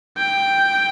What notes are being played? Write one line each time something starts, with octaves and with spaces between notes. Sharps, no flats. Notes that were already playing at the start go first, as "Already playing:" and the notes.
G5